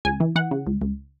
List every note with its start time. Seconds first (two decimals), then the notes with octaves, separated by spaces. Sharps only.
0.05 C#2 G#5
0.20 E3
0.36 E3 F#5
0.51 C#3
0.67 C#2
0.81 C#2